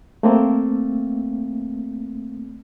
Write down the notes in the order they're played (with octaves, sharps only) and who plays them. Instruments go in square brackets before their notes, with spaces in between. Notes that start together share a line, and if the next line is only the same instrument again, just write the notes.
[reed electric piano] A3 A#3 C4